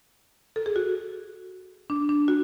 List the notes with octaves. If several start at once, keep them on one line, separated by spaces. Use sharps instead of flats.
A4
G#4
F#4
D4
D4
F#4